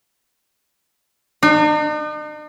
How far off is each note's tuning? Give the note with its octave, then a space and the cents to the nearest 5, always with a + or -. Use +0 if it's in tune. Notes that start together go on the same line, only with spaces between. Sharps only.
D#4 -45